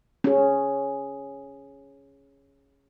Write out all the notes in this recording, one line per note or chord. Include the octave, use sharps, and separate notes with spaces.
C#4 G#4